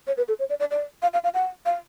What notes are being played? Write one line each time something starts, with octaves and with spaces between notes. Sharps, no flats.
C#5
B4
A4
C#5
D5
D5
D5
F5
F5
F5
F#5
F5